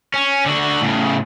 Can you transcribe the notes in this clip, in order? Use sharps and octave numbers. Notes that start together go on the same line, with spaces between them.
C#4
D3 F#4
A2 C#3